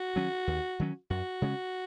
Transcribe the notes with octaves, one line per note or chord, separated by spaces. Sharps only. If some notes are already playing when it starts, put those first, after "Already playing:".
Already playing: F#4
D#3 F#3 C#4
D#2
D#3 F#3 C#4
F#2 F#4
C#3 G#3 C#4